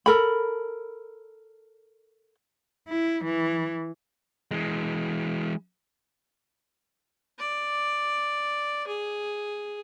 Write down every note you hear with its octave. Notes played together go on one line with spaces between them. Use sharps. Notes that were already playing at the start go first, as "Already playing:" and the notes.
A4 A#4 B5
E4
E3
E3 G#3
D5
G#4